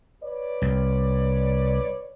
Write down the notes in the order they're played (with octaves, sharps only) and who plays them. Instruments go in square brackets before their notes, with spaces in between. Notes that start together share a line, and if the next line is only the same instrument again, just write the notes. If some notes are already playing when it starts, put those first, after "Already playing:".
[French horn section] B4 C#5 D5
[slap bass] C2